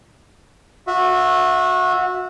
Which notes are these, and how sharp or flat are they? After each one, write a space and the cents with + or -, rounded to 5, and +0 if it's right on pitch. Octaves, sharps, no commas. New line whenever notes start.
F#4 -25 E5 +0